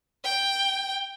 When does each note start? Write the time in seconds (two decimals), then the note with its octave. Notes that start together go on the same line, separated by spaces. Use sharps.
0.24 G5